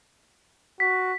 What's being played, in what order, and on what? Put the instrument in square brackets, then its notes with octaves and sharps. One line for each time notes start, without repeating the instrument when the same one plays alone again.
[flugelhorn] F#4 [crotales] B6